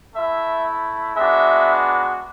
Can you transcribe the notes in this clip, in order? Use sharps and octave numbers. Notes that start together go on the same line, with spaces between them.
A3 E4 E5
G#3 B3 D4 F#4 E5